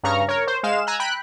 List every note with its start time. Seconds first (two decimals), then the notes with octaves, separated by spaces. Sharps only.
0.03 G2 C#3 A#5 C#6 F6
0.29 A#4 C#5
0.47 C5
0.63 G#3 F5 E7
0.87 G#5 A#5 E6 F#6
1.00 G5 B5 F#6